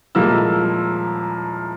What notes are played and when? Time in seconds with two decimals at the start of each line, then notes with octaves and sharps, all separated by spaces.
0.15 D#1 F3 G#3 A#3 E4 E6